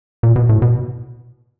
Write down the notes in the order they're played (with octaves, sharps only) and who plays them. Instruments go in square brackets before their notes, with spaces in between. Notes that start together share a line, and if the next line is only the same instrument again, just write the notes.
[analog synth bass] A#2
B2
A2
B2